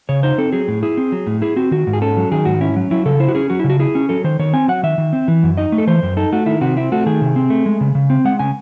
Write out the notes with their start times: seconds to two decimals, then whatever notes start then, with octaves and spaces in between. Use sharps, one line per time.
0.09 C#3 C#5
0.23 D#4 C5
0.38 C4 A4
0.53 F#3 G#4
0.68 A2
0.83 E4 G#4
0.97 C4
1.12 F#3
1.27 A2
1.42 E4 G#4
1.56 C4 F#4
1.71 D#3 F#4
1.87 G#2
1.93 G#4
2.02 C#4 A4
2.17 F#3
2.32 D#3 G#4
2.45 G#2 F#4
2.61 C#4 E4
2.76 F#3
2.91 F#3 E4
3.06 C#3 A4
3.20 E4 C5
3.28 F#4
3.35 C#4 G#4
3.50 F#3 F#4
3.59 C#3 E4
3.70 F#4
3.79 E4 G#4
3.95 C#4
4.09 F#3 A4
4.24 D#3 C5
4.39 D#3 C#5
4.53 C4 G#5
4.68 F#3 F#5
4.83 D#3 E5
4.98 D#3
5.13 C4
5.28 E3
5.43 F#2
5.57 D#4 D#5
5.72 A3
5.78 A4
5.87 E3 C5
6.03 F#2
6.17 D#4 A4
6.32 A3 F#4
6.46 D#3 E4
6.61 C3 F#4
6.77 C4 E4
6.92 A3 F#4
7.06 D#3 G#4
7.21 C3
7.36 C4
7.50 A3
7.66 G#3
7.81 C#3
7.95 C#3
8.10 C4
8.25 G#3 F#5
8.39 C#3 G#5